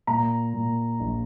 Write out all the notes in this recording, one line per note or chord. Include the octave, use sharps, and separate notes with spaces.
A#2 A#5
A#2
A#1